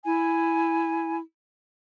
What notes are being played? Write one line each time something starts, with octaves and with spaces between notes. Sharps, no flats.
E4 G#5